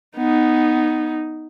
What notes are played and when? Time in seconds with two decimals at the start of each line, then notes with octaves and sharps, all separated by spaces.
0.17 B3 D#4